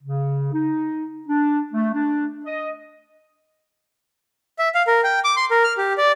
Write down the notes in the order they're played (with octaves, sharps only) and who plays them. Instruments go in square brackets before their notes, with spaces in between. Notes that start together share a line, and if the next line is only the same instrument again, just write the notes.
[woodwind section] C#3
D#4
D4
A3
D4
D#5
[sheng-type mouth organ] E5
F5
A#4
G5
D6
C6
A#4
F6
G4
D5